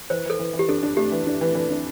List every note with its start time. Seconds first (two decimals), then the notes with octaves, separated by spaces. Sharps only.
0.10 E3 C5
0.25 E3 A4
0.39 E3
0.53 E3
0.59 G4
0.69 D4 A4
0.83 D4
0.97 A3 G4
1.12 E3
1.27 D4
1.41 E3
1.55 E3
1.70 D4